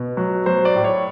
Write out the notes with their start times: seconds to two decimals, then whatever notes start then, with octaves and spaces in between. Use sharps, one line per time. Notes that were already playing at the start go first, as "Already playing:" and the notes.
Already playing: B2
0.17 F#3
0.46 F#3 C5
0.65 D5
0.76 A2
0.84 C#5